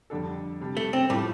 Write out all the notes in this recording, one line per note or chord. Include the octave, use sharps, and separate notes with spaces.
F2 D3 G3 D4 A4
C3 G3 D4
A3
C4
A2 F3 G3 A3 F4 A4